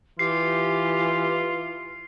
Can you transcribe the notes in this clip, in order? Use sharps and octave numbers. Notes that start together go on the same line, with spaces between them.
E3 F4 G4 C7